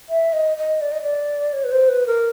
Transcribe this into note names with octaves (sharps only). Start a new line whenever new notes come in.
E5
D#5
D#5
D5
D#5
D5
C#5
B4
C5
B4
A#4